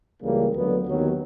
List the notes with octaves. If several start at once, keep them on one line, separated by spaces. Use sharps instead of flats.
C#2 C#3 E3 G3 A#3
D2 D3 F#3 B3
D#2 D#3 F#3 B3